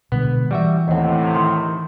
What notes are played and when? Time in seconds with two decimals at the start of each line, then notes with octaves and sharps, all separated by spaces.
0.12 B2 D3 G#3 B3
0.51 E3 G3 F#4 E5
0.88 D#2 A2 C3 C4 D#5 F#5
1.35 D#3 C6